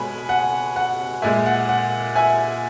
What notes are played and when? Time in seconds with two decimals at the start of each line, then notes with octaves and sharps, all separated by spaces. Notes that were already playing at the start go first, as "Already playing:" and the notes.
Already playing: B2 G#3 G#5 B5
0.29 F#5
0.76 F#5
1.22 A#2 G#3 E5 G#5
1.46 F#5
1.69 F#5
2.15 E5 G#5